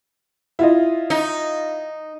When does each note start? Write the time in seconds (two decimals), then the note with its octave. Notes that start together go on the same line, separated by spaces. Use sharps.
0.59 E4 F4 D#5
1.10 D#4